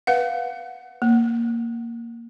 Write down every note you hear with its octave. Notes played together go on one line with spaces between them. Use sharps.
B4 F5 F#5
A#3